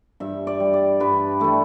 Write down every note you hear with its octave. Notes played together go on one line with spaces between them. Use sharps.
G2 E5
D5
G3
D5
G2 B4
E3 G3 A3